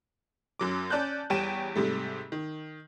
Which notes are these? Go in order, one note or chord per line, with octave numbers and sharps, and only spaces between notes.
F#2 F#3 D6
C#4 D5 A5 F#6 G6
E2 G3 C#5 G5 D#7 E7
G#2 C3 G3 A3
D#3